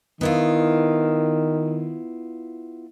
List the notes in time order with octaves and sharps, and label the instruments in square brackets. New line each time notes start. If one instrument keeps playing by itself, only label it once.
[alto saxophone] D#3 [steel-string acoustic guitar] B3 E4 F4